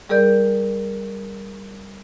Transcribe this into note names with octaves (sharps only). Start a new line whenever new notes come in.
G3 G#4 A#4 D5 G6